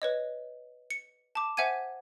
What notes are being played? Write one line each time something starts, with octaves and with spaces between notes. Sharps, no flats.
B4 C#5 D#5
C#7
A5 D6
C5 E5 F#5 G#5 G#6 D#7